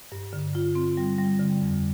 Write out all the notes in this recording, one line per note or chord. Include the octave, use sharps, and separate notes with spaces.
G2
D3
F4
C4
G3
G3
D3
F2